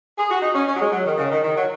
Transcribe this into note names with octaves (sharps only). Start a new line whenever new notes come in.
G#4
F#4
D#4
C#4
C#4
F#3
G#3
F#3
D#3
C#3
D#3
D#3
F#3